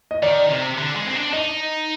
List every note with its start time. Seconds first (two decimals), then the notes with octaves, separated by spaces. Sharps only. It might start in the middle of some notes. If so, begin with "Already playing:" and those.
0.11 D#5
0.23 D#3 D5
0.50 C3
0.78 D3
0.96 G#3
1.06 C4
1.15 D4
1.33 D#4 D#5